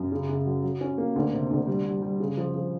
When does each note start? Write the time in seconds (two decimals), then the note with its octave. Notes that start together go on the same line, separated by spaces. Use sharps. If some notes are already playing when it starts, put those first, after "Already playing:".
Already playing: F#2
0.12 C#3
0.29 C#3
0.46 F#3
0.63 F#3
0.81 C#4
0.98 A#3
1.16 D2
1.33 C3
1.51 D2
1.67 G3
1.85 G3
2.02 G3
2.20 C#3
2.37 F3
2.54 F3